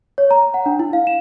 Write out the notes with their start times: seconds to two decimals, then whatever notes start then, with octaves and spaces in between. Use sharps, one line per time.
0.18 C#5
0.31 A#5
0.54 F#5
0.66 D4
0.79 E4
0.93 F5
1.07 E7